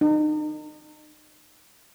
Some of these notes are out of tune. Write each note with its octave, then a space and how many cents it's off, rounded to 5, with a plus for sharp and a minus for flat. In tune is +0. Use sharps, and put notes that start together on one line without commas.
D#4 -35